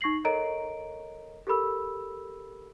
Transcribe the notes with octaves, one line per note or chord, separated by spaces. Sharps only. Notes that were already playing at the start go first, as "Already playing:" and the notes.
D#4 C#6 A#6 C7 F#7
A4 A#4 C#5 D#5 A#5 D7
G4 A4 A#4 B5 E6